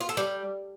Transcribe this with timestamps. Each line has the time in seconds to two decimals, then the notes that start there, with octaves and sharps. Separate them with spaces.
0.01 F4
0.09 A4
0.17 G3